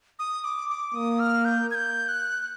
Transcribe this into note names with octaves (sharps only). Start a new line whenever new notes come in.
D#6
D6
D6
A#3 D#6
F6
G6
G#6
G6
F#6